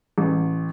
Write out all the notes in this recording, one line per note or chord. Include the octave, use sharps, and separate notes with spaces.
A1